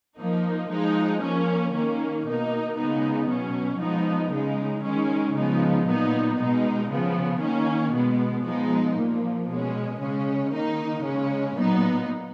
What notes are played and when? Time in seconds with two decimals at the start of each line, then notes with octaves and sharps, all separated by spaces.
0.18 F3 A#3 D#4
0.70 F3 G#3 D#4
1.22 F3 A#3 C#4
1.73 D#3 A#3 C#4
2.25 B2 A#3 D#4
2.76 C#3 G#3 B3 D#4
3.28 B2 F#3 C#4
3.80 F3 G#3 B3 D#4
4.31 C#3 G#3 D#4
4.83 D#3 G#3 C#4
5.35 C#3 F3 G#3 B3 D#4
5.87 A#2 F#3 B3 D#4
6.38 B2 G#3 D#4
6.90 C#3 F3 B3
7.41 D#3 A#3 C#4
7.93 B2 G#3 B3
8.44 F3 G#3 B3 D#4
8.96 A#2 F3 A#3
9.48 B2 G#3 C#4
10.00 C#3 G#3 C#4
10.51 D#3 A#3 D#4
11.03 C#3 G#3 C#4
11.55 A#2 F#3 B3 D#4